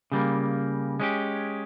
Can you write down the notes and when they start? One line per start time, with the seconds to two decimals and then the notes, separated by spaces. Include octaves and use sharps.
0.12 C#3 G3 A#3
1.00 G#3 C#4 G4